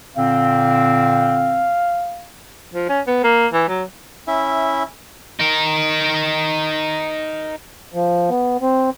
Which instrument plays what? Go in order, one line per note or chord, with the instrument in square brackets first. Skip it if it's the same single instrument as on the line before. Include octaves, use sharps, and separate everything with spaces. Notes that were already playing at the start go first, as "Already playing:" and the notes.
[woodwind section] A#2 D3 C4 [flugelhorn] F5
[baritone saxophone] F3
C#4
B3
A#3
E3
F#3
[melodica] C#4 E4 E5
[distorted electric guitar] D#4 A#4
[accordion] F3
B3
C4